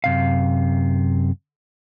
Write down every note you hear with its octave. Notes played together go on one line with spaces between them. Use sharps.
F#2 C3 F5